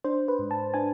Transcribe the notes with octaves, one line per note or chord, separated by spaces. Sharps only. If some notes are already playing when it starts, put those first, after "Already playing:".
D4 C5
B4
G#2
A5
D4 G#5